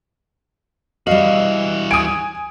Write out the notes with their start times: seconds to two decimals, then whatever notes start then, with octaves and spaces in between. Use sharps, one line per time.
1.07 E3 G3 F#4 D#5 F5
1.91 G#5 D#6 D7 D#7